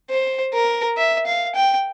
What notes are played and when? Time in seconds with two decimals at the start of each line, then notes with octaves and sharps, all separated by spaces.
0.10 C5
0.53 A#4
0.97 E5
1.26 F5
1.55 G5